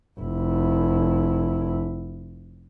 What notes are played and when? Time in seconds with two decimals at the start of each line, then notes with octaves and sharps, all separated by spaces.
0.19 F1 E4